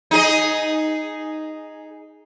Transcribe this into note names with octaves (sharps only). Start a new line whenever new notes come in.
D#4 G#4 D#5